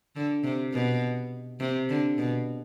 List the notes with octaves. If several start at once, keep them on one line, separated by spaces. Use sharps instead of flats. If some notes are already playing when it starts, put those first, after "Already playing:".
D3
C3
B2
C3
D3
B2